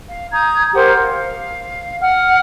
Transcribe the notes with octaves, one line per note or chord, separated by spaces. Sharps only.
F5
A#5 D#6 G6 G#6
G4 A#4 C5 F#5
F5
F#5 F6